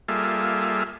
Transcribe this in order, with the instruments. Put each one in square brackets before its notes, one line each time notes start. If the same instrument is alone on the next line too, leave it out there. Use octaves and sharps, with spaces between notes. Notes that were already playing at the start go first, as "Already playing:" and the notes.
[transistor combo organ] G3 A#3 F4 G#4 A4 E5